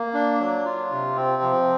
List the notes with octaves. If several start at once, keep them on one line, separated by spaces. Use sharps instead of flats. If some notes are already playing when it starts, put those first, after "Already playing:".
Already playing: A#3
D4
F#3
F4
C3
C4
F3